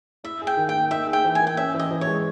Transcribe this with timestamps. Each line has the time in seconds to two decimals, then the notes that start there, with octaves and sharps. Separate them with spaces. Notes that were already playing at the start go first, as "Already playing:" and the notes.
0.24 E4 E5
0.42 G#4
0.47 G5
0.57 D#3
0.69 G5
0.74 A#3
0.91 D#4 E5
1.07 G#4
1.13 G5
1.25 E3
1.35 A#3 G#5
1.47 G5
1.57 C#4 E5
1.74 E3
1.79 D#5
1.91 E3
2.01 C#5
2.07 G#3